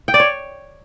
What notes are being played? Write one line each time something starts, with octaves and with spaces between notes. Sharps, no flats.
G5
D5
C#5